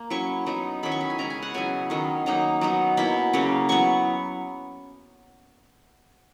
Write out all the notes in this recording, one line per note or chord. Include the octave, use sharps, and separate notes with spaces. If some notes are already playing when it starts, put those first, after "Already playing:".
Already playing: A#3
F#3 C#4 E4 C#6
F#3 B3 D#4
D#3 F#3 C#4 E4 B5
C#6
B5
G#5
C#3 G#3 C#4 E4 A#5
G#5
F#5
C#3 F#3 B3 E4 G#5
D#3 F#3 C#4
F#3 A#3 D#4 A#5
F#3 B3 D#4
B2 A#3 E4 B5
C#3 F#3 A#3 C#4
F#3 B3 E4 C#6